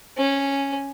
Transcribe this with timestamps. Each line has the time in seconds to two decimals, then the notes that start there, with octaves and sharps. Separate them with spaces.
0.17 C#4